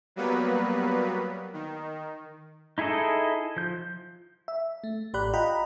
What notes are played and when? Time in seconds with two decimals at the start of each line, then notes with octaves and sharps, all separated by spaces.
0.16 F#3 G3 A#3 B3 B4
1.53 D#3
2.78 D#4 E4 G#4 A4 D#5
3.57 F3 G6
4.48 E5
4.84 A3
5.14 A1 G4 D5 B5 F#6
5.33 F4 D#5 F#5 G5 A#5 B5